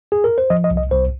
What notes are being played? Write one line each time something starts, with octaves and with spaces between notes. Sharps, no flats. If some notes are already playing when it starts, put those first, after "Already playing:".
G#4
A#4
C5
F3 D#5
D#5
C2
D#5
C2 C5